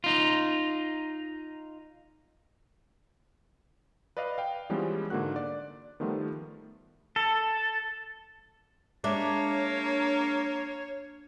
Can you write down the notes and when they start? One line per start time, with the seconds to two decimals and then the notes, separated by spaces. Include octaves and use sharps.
0.04 D#4 F4
4.17 B4 D5 D#5 F5
4.38 F5 G5
4.70 E3 F3 G3 G#3 B3 C#4
5.10 G#2 D3 A#3 F#4 F#6
5.36 D5
6.00 D#3 F3 G3 A3 B3 F4
7.16 A4
9.04 G#3 A#3 D4 C#5 E5